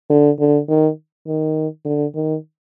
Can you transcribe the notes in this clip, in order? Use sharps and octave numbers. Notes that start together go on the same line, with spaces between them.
D3
D3
D#3
D#3
D3
D#3